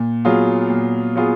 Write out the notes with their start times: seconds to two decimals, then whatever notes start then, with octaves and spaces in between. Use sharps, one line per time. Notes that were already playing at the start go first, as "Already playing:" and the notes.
Already playing: A#2
0.25 F#3 B3 F4 G#4
0.70 A#2
1.15 F#3 B3 F4 G#4